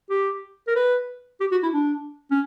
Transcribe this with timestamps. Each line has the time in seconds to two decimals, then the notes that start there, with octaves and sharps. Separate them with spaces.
0.10 G4
0.68 A#4
0.76 B4
1.41 G4
1.52 F#4
1.63 E4
1.74 D4
2.31 C#4